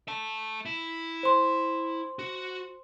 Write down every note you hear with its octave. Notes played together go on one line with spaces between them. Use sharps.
E5 A5
E4
C5 C6
F#4